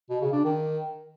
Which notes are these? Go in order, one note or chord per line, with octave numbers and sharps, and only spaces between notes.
B2
C#3
D4
D#3